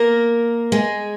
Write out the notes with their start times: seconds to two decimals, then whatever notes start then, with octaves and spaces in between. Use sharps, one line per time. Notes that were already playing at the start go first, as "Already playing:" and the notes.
Already playing: A#3 A#4
0.72 G#3 G#4